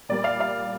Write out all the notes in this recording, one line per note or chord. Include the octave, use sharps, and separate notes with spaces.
A#2 G3 A#3 D5
F5
F5